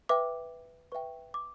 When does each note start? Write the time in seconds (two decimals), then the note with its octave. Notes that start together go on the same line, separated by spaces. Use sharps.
0.09 B4 E5 G5 D6
0.92 B4 E5 G5 C#6
1.34 D6